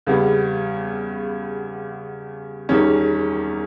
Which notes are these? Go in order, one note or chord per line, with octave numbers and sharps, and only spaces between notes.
E2 C#3 G3 B3
E1 E2 D#3 G3 C#4